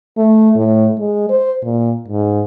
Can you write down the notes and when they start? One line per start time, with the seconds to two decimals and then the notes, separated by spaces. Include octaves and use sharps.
0.17 A3
0.56 A2
0.99 G#3
1.30 C5
1.64 A#2
2.08 G#2